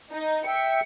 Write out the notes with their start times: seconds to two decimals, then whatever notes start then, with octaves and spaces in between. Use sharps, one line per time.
0.12 D#4
0.47 E5 G5 C#7